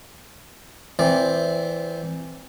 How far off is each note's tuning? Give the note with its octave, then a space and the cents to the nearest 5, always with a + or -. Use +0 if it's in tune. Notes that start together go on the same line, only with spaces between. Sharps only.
E3 +0 C4 +0 D5 -25